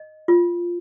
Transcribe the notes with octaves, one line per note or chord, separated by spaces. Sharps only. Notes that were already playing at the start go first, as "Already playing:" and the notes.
Already playing: D#5
F4